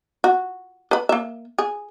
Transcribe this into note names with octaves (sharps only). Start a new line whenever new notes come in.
F#4
B4 B5
A#3 E5
G#4